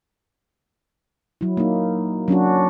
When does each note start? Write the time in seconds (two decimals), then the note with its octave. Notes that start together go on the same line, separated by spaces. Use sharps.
1.41 F#3 E4
1.57 A#3 D#4
2.28 F#3 C#4 D4 F#4